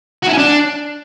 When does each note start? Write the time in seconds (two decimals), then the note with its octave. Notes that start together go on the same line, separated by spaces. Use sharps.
0.23 F#4
0.28 E4
0.33 C#4
0.38 D4